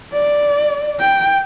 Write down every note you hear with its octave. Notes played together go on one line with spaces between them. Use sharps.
D5
G5